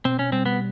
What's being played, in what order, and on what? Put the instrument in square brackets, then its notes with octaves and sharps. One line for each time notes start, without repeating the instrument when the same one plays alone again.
[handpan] B2 [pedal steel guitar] C4
[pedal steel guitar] C#4
[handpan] G3 [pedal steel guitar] C4
[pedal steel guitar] B3